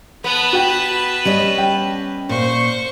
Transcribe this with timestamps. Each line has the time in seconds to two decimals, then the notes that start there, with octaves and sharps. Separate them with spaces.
0.24 B3 B4 A5
0.53 F#4 G5
1.25 G3 C#4 D#5
1.58 G5
2.29 A#2 C5 C#6